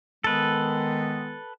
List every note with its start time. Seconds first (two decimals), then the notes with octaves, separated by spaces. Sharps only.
0.24 D#3 G#3 B3 A4 B4